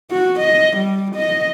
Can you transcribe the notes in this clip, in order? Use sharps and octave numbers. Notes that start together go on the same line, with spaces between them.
F#4
D#5
G3
D#5